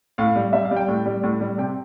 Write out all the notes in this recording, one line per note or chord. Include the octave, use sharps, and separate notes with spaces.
A2 F5
G3
G3 E5
F5
G3
G5
A2
G3
A2
G3
C3 G5